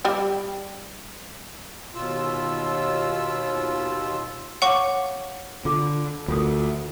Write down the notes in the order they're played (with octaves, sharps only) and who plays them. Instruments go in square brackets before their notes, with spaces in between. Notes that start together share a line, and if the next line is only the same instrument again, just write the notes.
[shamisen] G3 G4
[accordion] D#2 B2 F4 E6
[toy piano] C#5 F5 D6 [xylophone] F#5 C#6
[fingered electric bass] D3 [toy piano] F4 D6
[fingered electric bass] D2 [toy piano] F4 A#4 D#6